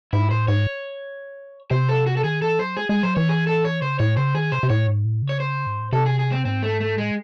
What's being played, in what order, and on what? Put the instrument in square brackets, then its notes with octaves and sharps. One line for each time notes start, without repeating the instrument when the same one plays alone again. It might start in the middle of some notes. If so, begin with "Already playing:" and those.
[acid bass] G#2 [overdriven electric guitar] E4
[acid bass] A2 [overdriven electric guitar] C5
[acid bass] G#2 [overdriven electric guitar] C#5
[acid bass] C3 [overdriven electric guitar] C5
[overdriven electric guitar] A4
F#4
A4
[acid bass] D#3 [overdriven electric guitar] G#4
[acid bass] E3 [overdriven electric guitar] A4
[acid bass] F#3 [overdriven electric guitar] C5
[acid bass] G#3 [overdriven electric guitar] G#4
[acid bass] G#3 [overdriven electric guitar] G#4
[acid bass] F#3 [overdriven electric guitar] C5
[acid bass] E3 [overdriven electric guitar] C#5
[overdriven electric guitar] G#4
A4
C#5
[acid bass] C#3 [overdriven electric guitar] C5
[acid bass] A2 [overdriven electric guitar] C#5
[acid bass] C#3 [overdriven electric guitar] C5
[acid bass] D#3 [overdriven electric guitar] G#4
[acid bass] C3 [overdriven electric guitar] C5
[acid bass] C3
[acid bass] A2 [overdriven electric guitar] C#5
[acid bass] G#2
A2
C#3
[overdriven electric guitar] C#5
C5
[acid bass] G#2
A2
[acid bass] C3 [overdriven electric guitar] A4
[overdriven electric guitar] G#4
G#4
C4
[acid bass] G#2 [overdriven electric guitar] C4
[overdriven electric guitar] A3
A3
[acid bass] A2 [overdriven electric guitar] G#3